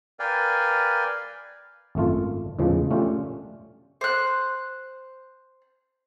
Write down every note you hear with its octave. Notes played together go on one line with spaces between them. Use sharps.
A#4 B4 D5 F5 G5 G#5
G#1 F#2 A3 F4
E2 A2 C#3 F3 G#3
A3 C#4 D4 F4 G4
C5 F#6